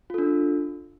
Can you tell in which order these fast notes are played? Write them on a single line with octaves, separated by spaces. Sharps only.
F4 A4 D4